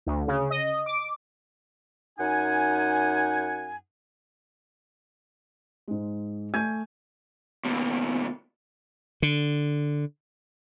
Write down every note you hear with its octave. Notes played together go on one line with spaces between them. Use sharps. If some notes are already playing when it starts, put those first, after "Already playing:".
D2
C#3
D#5
D6
F#2 D#4 F#5 G#5
G#2 G#3
A3 G#5 G6 G#6 D#7
D#2 B2
D3